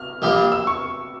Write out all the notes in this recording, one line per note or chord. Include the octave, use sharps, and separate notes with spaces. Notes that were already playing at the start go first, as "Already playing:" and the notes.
Already playing: F6
A#1 A#2 G3
E6
C#6